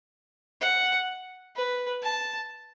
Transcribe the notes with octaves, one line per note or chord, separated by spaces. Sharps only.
F#5
B4
A5